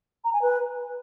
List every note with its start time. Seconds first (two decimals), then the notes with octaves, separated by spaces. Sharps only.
0.24 A#5
0.33 G#5
0.42 B4